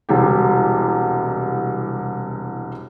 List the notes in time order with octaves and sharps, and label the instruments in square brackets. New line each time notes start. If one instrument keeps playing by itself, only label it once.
[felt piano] E1 C2 G4